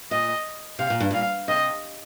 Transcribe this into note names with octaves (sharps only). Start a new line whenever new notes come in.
A#2 D#5
C3 F5
A#2
G2
A#2 F5
C3 D#5